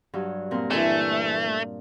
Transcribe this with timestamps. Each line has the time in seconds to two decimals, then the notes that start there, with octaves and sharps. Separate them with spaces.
0.13 G2 F#3
0.51 A#2 C4 A#4
0.71 E3 A3 D4 G#5